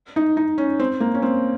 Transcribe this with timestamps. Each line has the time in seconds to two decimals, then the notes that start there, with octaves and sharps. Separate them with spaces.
0.16 D#4
0.37 D#4
0.58 C#4
0.80 C4
1.00 A#3
1.14 C#4
1.22 C4